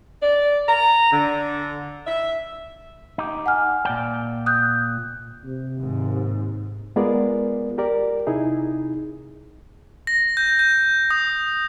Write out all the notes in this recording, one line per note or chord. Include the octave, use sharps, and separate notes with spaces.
D5
A#5
D3
E5
D#4 G4
F#5 G#5 F6
A#2 D5 G5
D#6 F#6 G6
C3
D#2 G#2
G#3 B3 F4 G#4 A#4 D5
G4 A#4 D5
C3 D#4 E4 G#4
A#6
G6
G6
D#6